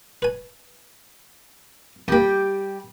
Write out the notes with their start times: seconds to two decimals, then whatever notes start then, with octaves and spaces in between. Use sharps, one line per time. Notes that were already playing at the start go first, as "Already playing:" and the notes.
0.22 B4 G#5
2.08 F2 G3 A#3 G4